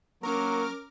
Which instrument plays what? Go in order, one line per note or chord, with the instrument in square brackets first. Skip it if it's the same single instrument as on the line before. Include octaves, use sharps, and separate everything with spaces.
[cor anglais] F#3 [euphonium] A#3 [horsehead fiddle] C#4 [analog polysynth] A#4 D6 F6